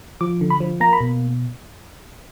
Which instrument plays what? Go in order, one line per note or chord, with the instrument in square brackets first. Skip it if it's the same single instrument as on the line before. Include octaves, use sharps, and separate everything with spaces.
[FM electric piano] F3 D6
D3
B5
F3
A#3 A#5
B5
B2